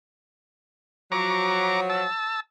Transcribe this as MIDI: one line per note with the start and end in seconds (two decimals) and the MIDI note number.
1.12 2.06 53
1.12 2.06 54
1.12 1.81 82
1.12 1.81 85
1.12 1.81 86
1.90 2.40 81
1.90 2.40 88